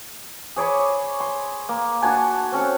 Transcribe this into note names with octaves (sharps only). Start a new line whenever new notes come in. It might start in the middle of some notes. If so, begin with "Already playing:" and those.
G#4 C#5 D5 B5
C6
A#3
D4 F#4 G#5 A5
C4 C#4 A4